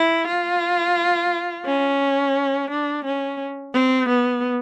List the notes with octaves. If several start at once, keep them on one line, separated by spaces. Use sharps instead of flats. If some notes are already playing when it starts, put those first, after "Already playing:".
Already playing: E4
F4
C#4
D4
C#4
C4
B3